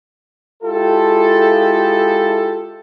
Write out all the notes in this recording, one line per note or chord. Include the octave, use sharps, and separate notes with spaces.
G#3 E4 F4 G4 A4